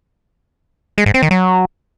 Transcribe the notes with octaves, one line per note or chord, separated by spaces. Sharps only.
G#3
G#2
C4
D#3
F#3